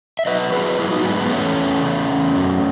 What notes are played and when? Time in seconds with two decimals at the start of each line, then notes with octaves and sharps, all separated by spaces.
0.19 E5
0.26 F#3 B4 D#5
0.52 F#3 G#4 B4
0.79 F#3 E4 G#4
0.91 D#4 F#4
1.04 G#2 G#3 B3
1.17 G#3 B3
1.30 E2 A3 C#4
1.57 E2
1.82 C#3
2.09 E2
2.35 F#2